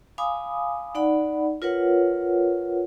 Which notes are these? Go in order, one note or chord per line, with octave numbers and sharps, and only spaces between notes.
F5 G#5 B5 D6 D#6
D#4 D5 F#5 B5
F4 A#4 B4 C#5 F#5